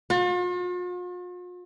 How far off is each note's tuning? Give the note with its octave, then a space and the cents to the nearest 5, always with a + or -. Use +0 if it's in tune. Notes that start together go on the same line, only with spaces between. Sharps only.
F4 +45